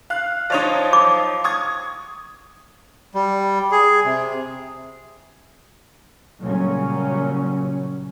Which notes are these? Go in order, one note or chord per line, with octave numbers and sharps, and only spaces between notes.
F5 F#6
F3 D#4 C#5 D5
D6
C#6 D#6 G#6
G3
G#4
C3
A#2 C#3 F#3 G3 C#4